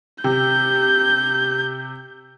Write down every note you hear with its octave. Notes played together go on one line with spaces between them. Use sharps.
C3 G6